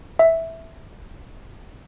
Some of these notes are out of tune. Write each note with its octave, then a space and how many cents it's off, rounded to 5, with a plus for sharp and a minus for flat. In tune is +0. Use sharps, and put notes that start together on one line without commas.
E5 -5